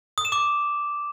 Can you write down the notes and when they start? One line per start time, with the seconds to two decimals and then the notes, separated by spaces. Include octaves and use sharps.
0.18 D#6
0.25 E7
0.32 D6